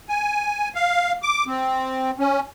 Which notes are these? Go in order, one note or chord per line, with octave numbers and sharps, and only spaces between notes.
G#5
F5
D6
C4
C#4